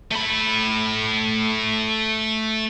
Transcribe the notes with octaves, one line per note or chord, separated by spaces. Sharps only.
A3 B5